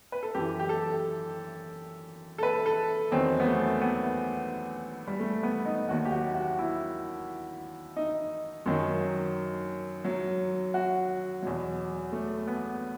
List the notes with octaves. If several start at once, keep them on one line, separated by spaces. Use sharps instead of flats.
B4
A4
F#2 E3 G4
G4
A4
A4
B4
A4
E2 D#3 F#3 C4
B3
A3
B3
G3
A3
B3
D#4
D#2 D#3 F#3 F#4
G4
F#4
F#4
E4
D#4
F#2 D#3 F#3
F#3
F#4
E2 B2 F#3
A3
B3